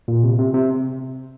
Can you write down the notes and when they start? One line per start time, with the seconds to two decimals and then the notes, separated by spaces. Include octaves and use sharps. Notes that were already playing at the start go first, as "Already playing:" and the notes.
0.08 A#2
0.23 C3
0.38 C3
0.54 C3